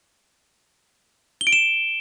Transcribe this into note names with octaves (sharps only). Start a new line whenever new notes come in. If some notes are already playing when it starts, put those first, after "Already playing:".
G7
D7
E7